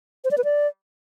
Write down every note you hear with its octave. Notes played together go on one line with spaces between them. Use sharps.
C5
D5
B4
D5